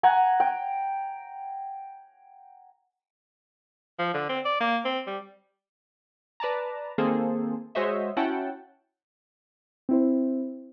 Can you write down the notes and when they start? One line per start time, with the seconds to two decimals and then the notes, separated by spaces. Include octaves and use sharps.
0.03 F#5 G#5 A#5
0.40 G5
3.99 F3
4.14 D3
4.29 C4
4.45 D5
4.60 A#3
4.85 C4
5.07 G3
6.40 B4 D5 A5 A#5
6.98 D#3 A#3 C4 G#4 A4 C5
7.75 G#3 F#4 C5 C#5 D#5 E5
8.17 C#4 E4 F#4 F#5 G5 A5
9.89 C4 E4 C5